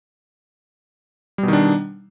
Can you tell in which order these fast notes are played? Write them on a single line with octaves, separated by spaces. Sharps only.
G3 B2 D#3 D4